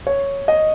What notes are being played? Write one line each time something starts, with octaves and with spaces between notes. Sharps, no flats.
C#5
D#5